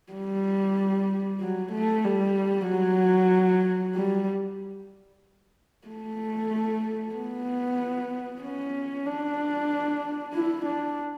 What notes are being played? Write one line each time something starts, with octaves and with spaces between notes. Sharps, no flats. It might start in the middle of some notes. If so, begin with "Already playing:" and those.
G3
F#3
A3
G3
F#3
G3
A3
B3
C#4
D4
E4
D4